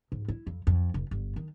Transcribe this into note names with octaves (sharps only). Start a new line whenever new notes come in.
G#2
E4
F2
F2
F1
G1
D#3